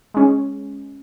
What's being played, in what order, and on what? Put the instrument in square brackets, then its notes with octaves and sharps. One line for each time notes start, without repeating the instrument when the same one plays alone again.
[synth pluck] G#3 C#4